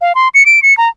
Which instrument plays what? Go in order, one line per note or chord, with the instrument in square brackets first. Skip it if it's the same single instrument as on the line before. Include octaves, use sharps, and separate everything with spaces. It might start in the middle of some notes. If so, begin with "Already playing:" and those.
[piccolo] F5
C6
C#7
D7
C#7
A#5